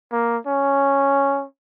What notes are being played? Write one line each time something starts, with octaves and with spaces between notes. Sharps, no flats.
A#3
C#4